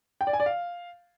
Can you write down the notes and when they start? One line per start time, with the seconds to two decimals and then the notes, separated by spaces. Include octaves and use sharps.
0.21 G5
0.27 D5
0.33 G#5
0.40 D5
0.46 F5